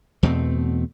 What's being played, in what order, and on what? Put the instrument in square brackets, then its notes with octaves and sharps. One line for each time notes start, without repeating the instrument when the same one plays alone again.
[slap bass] E2 B2 A3 C4